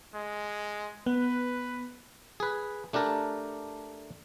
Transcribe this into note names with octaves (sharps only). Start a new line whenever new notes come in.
G#3
B3 B4
G#4 B4
A3 D4 G4 A#4 D5